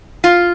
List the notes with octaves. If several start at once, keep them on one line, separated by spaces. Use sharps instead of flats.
F4